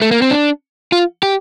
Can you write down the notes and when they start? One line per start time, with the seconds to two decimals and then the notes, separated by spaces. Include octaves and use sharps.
0.02 A3
0.11 A#3
0.22 C4
0.31 D4
0.92 F4
1.23 G4